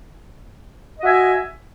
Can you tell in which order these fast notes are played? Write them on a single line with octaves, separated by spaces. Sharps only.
D#5 F#4 E5 G#5